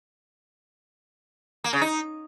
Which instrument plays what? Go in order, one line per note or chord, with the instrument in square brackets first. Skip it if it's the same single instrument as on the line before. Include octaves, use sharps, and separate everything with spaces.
[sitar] A#3
C#3
D#4